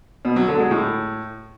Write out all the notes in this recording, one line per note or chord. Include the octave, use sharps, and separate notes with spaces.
B2
F#3
D3
G#3
A2